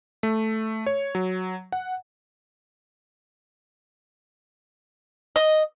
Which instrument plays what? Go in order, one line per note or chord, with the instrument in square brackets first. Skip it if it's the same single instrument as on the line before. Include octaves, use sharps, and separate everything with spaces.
[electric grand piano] A3
C#5
F#3
F#5
[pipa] D#5